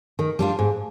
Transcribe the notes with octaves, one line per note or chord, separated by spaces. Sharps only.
D#3
G3 D4 F4
G#2